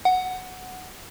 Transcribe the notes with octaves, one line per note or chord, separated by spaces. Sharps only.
F#5